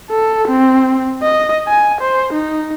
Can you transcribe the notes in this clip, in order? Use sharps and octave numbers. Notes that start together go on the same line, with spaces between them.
A4
C4
D#5
G#5
C5
D#4